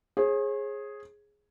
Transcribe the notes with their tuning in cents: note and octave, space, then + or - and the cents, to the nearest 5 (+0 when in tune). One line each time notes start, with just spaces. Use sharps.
G#4 +0 C#5 -45